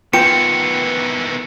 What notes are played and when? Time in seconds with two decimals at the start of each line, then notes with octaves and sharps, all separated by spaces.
0.13 D#3 E3 B3 F4 G5 C#7